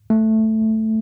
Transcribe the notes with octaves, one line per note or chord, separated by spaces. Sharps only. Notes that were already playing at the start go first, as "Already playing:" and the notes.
A3